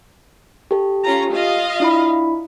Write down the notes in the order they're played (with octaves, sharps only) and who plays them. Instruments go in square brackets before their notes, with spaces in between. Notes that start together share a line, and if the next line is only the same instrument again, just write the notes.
[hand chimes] G4 A4
[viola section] C#4 F4 A#5
F4 D#5 F5
[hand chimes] D4 E4 B5